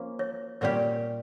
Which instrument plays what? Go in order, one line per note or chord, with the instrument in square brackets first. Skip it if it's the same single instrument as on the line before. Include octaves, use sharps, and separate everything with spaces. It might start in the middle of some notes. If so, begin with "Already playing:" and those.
Already playing: [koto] F3 A#3 C#4
[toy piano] C#5
[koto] A#2 G3 C#4 G4 [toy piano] C#5